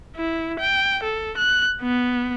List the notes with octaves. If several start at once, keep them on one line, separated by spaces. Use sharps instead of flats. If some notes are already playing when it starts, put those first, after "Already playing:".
E4
G5
A4
F#6
B3